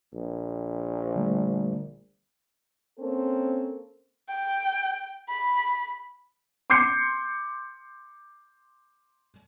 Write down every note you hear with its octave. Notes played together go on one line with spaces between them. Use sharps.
A#1
D3 G3 A3
A#3 C4 C#4 A4 A#4 C5
G5
B5
C6 D6 G6 C7 C#7